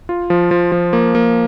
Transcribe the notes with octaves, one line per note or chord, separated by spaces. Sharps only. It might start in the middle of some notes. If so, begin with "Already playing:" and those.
F4
F3
F3
F3
A#3
A#3